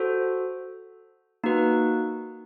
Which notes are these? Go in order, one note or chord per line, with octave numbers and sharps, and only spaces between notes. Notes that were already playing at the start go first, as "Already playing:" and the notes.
Already playing: F#4 A4 C5
A#3 D#4 F#4 B4